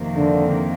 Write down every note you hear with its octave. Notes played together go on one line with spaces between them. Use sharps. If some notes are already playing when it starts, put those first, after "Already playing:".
Already playing: F2 C3 D#3 A#3
D3